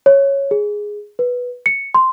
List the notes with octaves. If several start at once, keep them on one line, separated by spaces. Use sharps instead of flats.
C#5
G#4
B4
C#7
C6